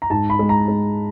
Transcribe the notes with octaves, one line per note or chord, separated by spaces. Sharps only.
A#5
G#2 A5
B5
G#3
A#5
G#3